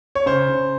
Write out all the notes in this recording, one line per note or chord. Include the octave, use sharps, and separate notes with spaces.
C#5
C#3 C5
C#3